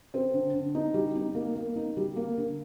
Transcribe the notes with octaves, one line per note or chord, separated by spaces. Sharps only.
C4
D3
D3
D#4
G3
D#4
A#3
A#3
D#4
G3
A#3
D3